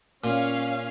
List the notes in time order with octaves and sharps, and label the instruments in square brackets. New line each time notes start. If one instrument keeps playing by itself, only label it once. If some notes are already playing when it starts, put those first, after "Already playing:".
[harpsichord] A#2 [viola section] C#4 F5